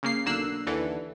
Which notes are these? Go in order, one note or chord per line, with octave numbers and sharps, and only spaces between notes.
C#3 A#3 C7
B1 D3 A#3 E6 F#6 C7
D#2 D3 E3 A4